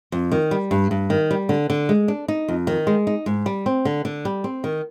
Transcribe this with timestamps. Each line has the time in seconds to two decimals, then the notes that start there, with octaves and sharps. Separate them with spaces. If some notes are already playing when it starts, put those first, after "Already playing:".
0.12 F2
0.32 D#3
0.51 G3
0.71 G2
0.91 G2
1.10 D#3
1.31 G3
1.49 D3
1.70 D3
1.89 G#3
2.08 D4
2.28 D#4
2.48 F2
2.67 D#3
2.87 G#3
3.07 D#4
3.26 G#2
3.46 G3
3.66 C4
3.85 D3
4.05 D3
4.25 G3
4.44 C4
4.64 D#3